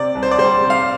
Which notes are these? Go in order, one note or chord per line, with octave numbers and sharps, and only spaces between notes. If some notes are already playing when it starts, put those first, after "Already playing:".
Already playing: C3 D5
C2
C5
D5
G3 C5
C3
F5